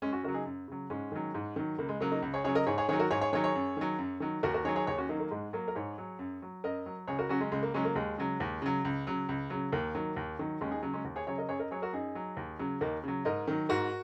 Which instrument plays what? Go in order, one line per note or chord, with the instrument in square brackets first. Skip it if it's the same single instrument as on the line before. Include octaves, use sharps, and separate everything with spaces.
[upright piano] F#2 G#3 C#4
C#4 F#4
C#3 F#4 A#4
F#3
D#4 G#4
F#2
C#3 F#3
G#2 G#3 C#4
D#3 F#3
G#2
D#3 F#3
C#2 A#3
G#3
C#3 F#3 A#3
A#3 D#4
C#2
G#4 C#5
C#3 F#3 G#4 C#5
A#4 D#5
G#2 G#4 C#5
G#4 C#5
D#3 G#4 C#5
F#3
F#4 A#4
G#2 G#4 C#5
G#4 C#5
D#3 F#3 G#4 C#5
G#4 C#5
F#2
D#3 F#3
F#2
D#3 F#3
D#2 F#4 A#4
F#4 A#4
D#3 F#3 G#4 C#5
G#4 C#5
D#2 G#4 C#5
C#4 F#4
D#3 F#3 A#3 D#4
A#3
G#2 G#3
F#3 A#3
A#4
G#2 G#4 C#5
F#3
F#2
F#3
F#2 A#4 D#5
F#3
C#2 G#4 C#5
F#4 A#4
C#3 F#3 C#4 F#4
G#3 C#4
C#2 G#3
A#3
C#3 F#3 G#3 C#4
A#3
D#2 G#3
C#3 F#3
D#2
C#3 F#3
C#2
C#3 F#3
C#2
C#3 F#3
D#2 A#3
D#3 F#3
D#2
D#3 F#3
D#2 G#3 C#4
D#4 G#4
C#3 F#3
G#3 C#4
D#2
G#4 C#5
C#3 F#3 G#4 C#5
A#4 D#5
F#2 G#4 C#5
A#4 D#5
F#3 G#4 C#5
F#4 A#4
F#2 D#4 G#4
F#3
D#2
C#3 F#3
D#2 A#3 D#4
C#3 F#3
G#2 A#4 D#5
D#3 F#3
G#2 F#4 A#4